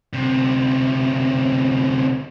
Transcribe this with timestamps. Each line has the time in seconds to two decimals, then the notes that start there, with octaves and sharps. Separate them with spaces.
0.13 D2 C3